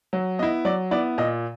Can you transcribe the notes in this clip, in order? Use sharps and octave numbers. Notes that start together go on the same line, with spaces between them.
F#3
B3 E4 D#5
F#3 D5
B3 E4 D5
A#2 D#5